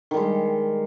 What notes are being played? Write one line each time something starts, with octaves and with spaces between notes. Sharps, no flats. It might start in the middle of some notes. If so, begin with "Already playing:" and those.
D#3 G3 G#3